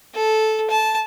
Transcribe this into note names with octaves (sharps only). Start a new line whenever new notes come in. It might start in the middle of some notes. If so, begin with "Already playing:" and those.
A4
A5